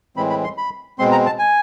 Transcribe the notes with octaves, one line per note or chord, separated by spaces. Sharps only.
A2 E3 G#3 C4 B5
B5
C6
B5
B2 G#3 C4 C6
A#5
A5
G#5